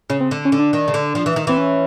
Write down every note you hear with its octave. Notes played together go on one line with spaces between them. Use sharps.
C#3 C#4
C4
D3
C#4
D3
D4
D#3
C#3
D3
F3
E3
D#3
E3 C4
C#4